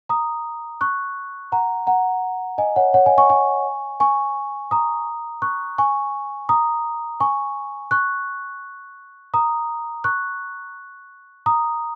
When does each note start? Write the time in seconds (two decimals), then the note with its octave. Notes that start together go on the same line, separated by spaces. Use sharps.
0.09 A#5 D#6
0.81 C#6 F#6
1.52 F#5 A#5
1.87 F#5 A#5
2.58 D#5 G#5
2.76 C#5 F#5
2.94 C#5 F#5
3.06 D#5 G#5
3.18 G#5 C#6
3.30 G#5 C#6
4.00 G#5 C#6
4.71 A#5 D#6
5.42 C#6 F#6
5.78 G#5 C#6
6.49 A#5 D#6
7.20 G#5 C#6
7.91 C#6 F#6
9.34 A#5 D#6
10.04 C#6 F#6
11.46 A#5 D#6